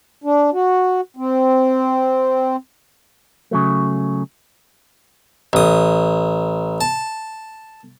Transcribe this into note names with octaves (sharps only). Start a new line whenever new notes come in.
D4
F#4
C4
C#3 F#3 A3
A1 D#6
A5